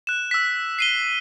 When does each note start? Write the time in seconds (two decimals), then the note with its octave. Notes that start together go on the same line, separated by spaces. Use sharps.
0.07 F#6 E7
0.31 E6 B6
0.79 C7 D#7 G7